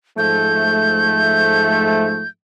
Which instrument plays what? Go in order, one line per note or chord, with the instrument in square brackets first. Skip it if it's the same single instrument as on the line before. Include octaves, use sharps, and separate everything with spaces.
[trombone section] G#2 F3 A3 [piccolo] G6